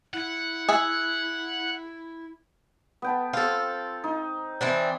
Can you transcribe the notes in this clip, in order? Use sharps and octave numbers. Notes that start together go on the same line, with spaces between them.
E4 F#5
G#4 E5
B3 G5 A5
C4 F4 A4
D#4
E3 C4 D4